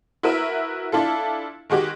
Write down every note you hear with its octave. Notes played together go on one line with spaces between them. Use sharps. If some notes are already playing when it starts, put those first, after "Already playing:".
E4 F#4 A#4 B4 E5
D4 E4 F4 A4
D#3 G#3 F#4 G4